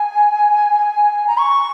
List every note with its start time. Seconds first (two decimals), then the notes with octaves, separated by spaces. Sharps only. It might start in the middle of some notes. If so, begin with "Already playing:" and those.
Already playing: G#5
1.27 A#5
1.39 C#6